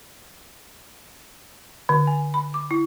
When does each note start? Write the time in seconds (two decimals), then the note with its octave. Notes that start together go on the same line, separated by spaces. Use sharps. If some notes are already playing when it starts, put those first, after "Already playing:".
1.89 D3
2.07 G#5
2.34 B5
2.54 D6
2.71 E4